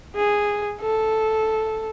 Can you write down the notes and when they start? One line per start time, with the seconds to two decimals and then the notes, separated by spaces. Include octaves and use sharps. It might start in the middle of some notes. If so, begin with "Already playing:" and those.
0.16 G#4
0.81 A4